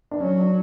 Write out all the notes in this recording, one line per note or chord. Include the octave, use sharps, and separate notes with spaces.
D4
F#3 C#4
D4